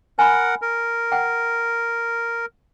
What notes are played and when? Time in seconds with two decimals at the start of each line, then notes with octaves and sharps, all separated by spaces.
0.19 A#4 F#5 G#5 B5
0.62 A#4
1.12 F#5 G5